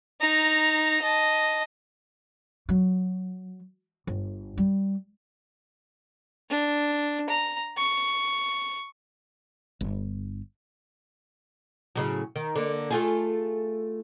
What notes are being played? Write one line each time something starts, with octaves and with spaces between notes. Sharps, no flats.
D#4 A#5
D#5 A5
F#3
G1
G3
D4
A#5
C#6
G1
A2 C#3 F#3
D#3
D3 A#3
A3 F4 G#4